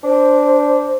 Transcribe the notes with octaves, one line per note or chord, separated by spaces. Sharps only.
D4 C5